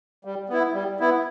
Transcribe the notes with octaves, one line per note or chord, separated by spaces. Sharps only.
G3
B3 E4
G3
B3 E4